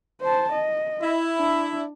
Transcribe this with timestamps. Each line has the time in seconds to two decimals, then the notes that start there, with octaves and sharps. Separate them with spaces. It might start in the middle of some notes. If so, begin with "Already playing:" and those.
0.21 C5 A5
0.53 D#5
1.01 E4
1.38 D4